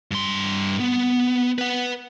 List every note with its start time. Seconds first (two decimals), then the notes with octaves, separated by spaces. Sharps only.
0.11 G2 C6
0.80 B3
1.59 B4 F#5